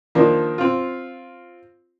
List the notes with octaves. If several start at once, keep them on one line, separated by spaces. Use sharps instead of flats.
D#3 F3 A#3 D4
C4 F4